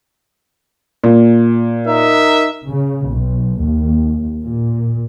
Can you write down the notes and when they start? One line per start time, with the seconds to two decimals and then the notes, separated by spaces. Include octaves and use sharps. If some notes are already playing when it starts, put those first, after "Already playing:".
1.04 A#2
1.88 D#4 A#4 E5
2.67 C#3
3.07 B1
3.60 D#2
4.44 A#2